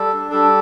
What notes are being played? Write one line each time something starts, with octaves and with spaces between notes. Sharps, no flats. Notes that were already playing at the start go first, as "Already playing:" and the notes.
Already playing: G3 A4
D4
G3 A4